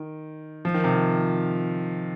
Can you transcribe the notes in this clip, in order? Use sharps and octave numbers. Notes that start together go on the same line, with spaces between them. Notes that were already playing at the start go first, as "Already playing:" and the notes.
Already playing: D#3
F3
D#3
C3
D#3